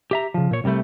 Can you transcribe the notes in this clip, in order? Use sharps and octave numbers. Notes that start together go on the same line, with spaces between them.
G4 E5 A#5
C#3 F3
A#2 C#5
C2 C3 D#3 G3 A3